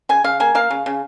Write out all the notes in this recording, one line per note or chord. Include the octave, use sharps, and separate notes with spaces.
C#3 G#5
C#3 F5
A#3 G#5
A#3 F5
C#3
C#3